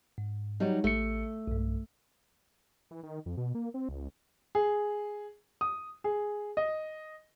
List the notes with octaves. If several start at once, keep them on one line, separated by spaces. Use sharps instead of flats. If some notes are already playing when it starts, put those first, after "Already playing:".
G#2
F#3 G3 D#4
A1 A3 C#7
B1 G2
E3
D#3
F2
B2
A#3
C4
C#2
G#4
D#6
G#4
D#5